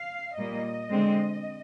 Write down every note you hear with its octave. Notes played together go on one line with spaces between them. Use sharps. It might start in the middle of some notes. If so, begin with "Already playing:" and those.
Already playing: F5
A#2 G3 A#3 D#5
D3 G#3 C4